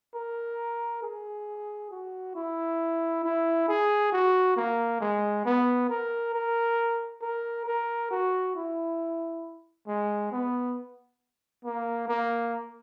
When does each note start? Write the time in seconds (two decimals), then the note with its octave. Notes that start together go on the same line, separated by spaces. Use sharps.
0.14 A#4
1.03 G#4
1.91 F#4
2.35 E4
3.24 E4
3.68 G#4
4.12 F#4
4.56 A#3
5.00 G#3
5.45 B3
5.89 A#4
6.34 A#4
7.22 A#4
7.66 A#4
8.11 F#4
8.55 E4
9.88 G#3
10.32 B3
11.65 A#3
12.08 A#3